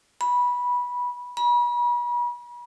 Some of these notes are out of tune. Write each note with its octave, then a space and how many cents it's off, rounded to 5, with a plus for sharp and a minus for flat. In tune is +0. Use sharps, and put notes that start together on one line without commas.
B5 -15
B5 -40